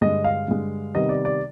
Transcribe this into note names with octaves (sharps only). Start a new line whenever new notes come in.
G2 D3 G#3 D#5
F5
G2 D3 G#3
C3 D#3 G3 B3 D#5
D5
D5